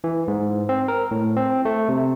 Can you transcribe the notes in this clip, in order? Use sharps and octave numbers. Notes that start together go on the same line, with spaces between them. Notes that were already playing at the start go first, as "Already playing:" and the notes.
E3
G#2
C4
A#4
A2
C4
A3
C3